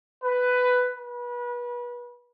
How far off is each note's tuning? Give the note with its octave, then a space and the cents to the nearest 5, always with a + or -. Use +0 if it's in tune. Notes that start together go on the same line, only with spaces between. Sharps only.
B4 +10
B4 -30